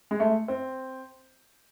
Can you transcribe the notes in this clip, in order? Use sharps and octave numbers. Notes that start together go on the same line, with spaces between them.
G#3
A3
C4